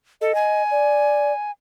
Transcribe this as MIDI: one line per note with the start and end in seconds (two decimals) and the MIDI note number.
0.21 0.34 69
0.21 0.63 75
0.35 1.51 80
0.71 1.32 74